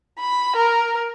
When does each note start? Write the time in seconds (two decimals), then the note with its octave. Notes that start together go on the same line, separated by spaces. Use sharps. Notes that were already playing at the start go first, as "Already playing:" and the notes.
0.19 B5
0.56 A#4